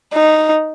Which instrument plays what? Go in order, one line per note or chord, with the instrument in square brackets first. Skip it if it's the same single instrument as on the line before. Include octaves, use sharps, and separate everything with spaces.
[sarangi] D#4